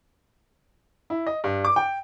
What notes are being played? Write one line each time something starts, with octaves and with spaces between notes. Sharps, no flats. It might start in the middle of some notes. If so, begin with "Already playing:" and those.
E4
D#5
G2
D6
G5